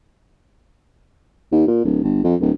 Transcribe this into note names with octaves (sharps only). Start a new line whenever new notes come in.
D#2
A#2
D1
G1
F2
D1